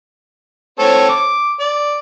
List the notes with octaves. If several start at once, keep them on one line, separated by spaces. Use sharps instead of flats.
C4 A4 C#5
D6
D5